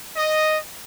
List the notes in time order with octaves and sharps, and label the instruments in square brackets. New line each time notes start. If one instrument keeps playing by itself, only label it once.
[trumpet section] D#5